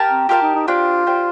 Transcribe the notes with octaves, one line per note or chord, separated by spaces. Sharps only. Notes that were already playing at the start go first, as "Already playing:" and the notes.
Already playing: G4 A#4 A5
C4
F4 G4 A#4 F5 A5
D#4
D#4
D4 F4 G4 C5
D4 G4 C5